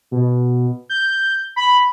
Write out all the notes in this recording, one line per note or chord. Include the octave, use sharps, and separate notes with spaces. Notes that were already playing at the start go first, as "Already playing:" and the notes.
B2
G6
B5